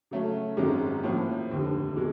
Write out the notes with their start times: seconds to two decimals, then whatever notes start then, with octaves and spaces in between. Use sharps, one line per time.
0.11 C#3 F#3 A3 C#4
0.57 G#1 F#2 D#3 G#3 C#4
1.03 A2 F3 A#3 C#4
1.51 F1 D#2 D3
1.97 B2 G#3